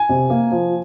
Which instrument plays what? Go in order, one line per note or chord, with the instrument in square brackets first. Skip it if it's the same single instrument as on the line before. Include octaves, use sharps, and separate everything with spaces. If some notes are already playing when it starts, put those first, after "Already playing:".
Already playing: [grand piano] G#5
C3
A#3
F3